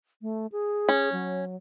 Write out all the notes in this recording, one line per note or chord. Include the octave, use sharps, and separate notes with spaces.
A3
G#4
C#4
F#3